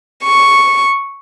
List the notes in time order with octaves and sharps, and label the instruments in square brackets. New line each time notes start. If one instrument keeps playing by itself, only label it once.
[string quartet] C#6